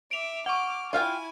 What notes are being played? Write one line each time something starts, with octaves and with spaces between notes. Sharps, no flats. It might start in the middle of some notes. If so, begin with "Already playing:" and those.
E5 D6 D7 F7
F#5 C#6 D6 F6
E4 F4 F5 G5 G#5